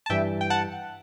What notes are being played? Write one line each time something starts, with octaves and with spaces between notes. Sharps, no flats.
A5
G2 E3 G3 E5 G5
G5
F#5 A5